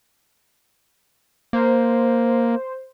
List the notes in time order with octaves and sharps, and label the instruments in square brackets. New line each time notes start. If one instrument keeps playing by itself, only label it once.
[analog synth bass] A#3 [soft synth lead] C5